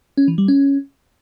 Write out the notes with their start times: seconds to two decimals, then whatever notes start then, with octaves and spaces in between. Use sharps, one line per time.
0.17 C#4
0.28 E3
0.38 G3
0.48 C#4